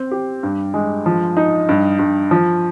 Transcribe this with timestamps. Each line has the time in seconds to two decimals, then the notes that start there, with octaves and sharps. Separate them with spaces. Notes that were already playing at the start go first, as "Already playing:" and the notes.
Already playing: C4
0.11 G4
0.43 G2
0.74 G#3
1.06 F3
1.37 D#4
1.69 G2
1.99 G2
2.31 F3